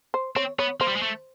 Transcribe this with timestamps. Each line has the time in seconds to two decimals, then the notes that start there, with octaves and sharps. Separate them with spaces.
0.14 C5
0.36 C4 C#5
0.59 B3 C#5
0.80 A#3 C5
0.88 G3
0.96 G#3
1.02 A3